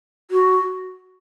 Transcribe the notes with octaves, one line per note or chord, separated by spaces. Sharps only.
F#4